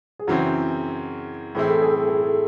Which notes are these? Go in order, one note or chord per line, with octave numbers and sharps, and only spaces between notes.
G#4
F#2 C#3 E3 C4 F#4
A2 E3 C4 E4 G#4
A4
G#4
A4
G#4
A4